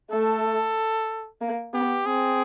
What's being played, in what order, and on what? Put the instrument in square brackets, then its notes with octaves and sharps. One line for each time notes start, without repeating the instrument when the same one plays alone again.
[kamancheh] A3 [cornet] A4
[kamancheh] A#3
[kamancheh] B3 [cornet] G4
[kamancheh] C4 [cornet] G#4